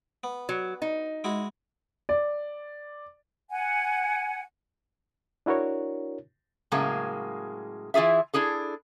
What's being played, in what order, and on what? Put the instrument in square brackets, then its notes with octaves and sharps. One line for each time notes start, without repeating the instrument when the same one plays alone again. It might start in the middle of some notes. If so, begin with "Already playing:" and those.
[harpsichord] B3
[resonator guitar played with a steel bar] F#3
D#4
[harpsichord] G#3 E4 F#4
[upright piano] D5
[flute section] F#5 G#5
[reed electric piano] D4 E4 F#4 A#4 C#5
[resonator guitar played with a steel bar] A2 C#3 F#3 G#3 A#3
E3 E4 F4 G#4 E5
D4 E4 G#4 A4